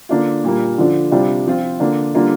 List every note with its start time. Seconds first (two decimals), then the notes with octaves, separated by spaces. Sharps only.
0.09 D3 A#3 D4 F4
0.44 A#2 G3 A#3
0.78 D3 F3 D4 F4
1.12 C3 G3 D4 F4
1.46 F3 C4 F4
1.80 D3 A#3 D4 F4
2.14 D3 G3 A#3 D4 F4